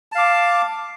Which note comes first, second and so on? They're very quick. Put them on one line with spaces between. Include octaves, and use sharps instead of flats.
A5 F5 D6